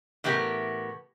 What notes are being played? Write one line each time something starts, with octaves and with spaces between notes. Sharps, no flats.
A2 E3 B3 G4 A#4